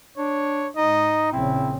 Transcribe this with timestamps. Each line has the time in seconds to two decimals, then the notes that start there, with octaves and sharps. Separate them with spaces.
0.17 D4 C#5
0.76 G#2 D#4 D#5
1.33 A#1 C#3 C4 E4